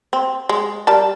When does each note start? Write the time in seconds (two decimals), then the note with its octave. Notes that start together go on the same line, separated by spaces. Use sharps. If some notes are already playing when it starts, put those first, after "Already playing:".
0.13 C4
0.49 G#3
0.87 G3 A#4 A5